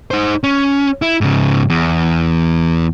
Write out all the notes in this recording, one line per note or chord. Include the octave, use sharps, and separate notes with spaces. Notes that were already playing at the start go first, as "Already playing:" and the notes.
D#4 C5
C#4
E4
G#2 C#3
E2